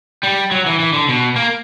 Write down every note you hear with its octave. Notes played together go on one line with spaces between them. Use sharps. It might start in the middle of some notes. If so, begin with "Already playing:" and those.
G3
F#3
E3
E3
D3
B2
A#3